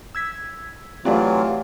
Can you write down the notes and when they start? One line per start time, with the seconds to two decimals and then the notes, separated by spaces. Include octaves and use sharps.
0.15 E6 G#6 B6
1.05 E3 F#3 A3 C4 F4 G4 D5